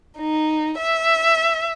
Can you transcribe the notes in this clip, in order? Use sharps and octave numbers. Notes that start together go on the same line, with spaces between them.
D#4
E5